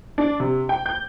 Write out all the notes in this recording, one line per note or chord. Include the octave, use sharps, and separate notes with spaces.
D4
C3
G5
G6